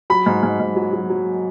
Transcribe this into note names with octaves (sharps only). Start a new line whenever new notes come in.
F#3 B5
G#2
G#2
G#2
F#3
F#3
F#3